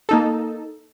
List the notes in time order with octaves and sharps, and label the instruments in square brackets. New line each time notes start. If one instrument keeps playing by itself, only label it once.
[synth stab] A#3 D#4 A4